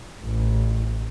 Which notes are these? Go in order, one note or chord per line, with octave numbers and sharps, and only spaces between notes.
A1